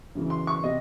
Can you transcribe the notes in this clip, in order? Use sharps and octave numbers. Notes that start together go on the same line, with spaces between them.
F#2 C#3 E3
C6
C#6
C3 D#5